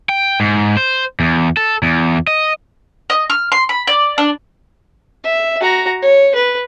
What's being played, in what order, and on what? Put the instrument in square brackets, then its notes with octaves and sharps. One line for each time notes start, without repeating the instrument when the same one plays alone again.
[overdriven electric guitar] G5
G#2
C5
E2
A4
E2
D#5
[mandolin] D#5
F6
C6
B5
D5
D4
[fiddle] E5
F#4 A#5
C#5
B4